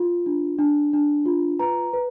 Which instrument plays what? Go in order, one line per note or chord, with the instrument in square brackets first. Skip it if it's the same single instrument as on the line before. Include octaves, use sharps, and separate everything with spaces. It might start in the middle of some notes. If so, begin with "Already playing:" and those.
Already playing: [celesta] F4
D4
D4
D4
F4
B4 A#5
B4